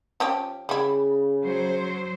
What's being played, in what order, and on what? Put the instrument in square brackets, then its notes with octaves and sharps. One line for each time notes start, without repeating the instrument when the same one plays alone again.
[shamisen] F3 C#4 G4
[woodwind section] C#3 [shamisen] G3 E4
[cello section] F#3 C5